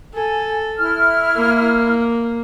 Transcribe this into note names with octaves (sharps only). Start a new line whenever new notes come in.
A4 G#5
E4 F6
A#3